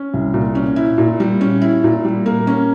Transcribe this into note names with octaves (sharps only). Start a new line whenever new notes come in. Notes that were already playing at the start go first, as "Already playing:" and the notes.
Already playing: C#4
C2
A#2
C#4
E4
A#2
G3
C#4
E4
A#2
G3
A#3
C#4